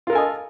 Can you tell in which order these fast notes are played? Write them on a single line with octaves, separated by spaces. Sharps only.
F4 A#4 A4 G#5 D#5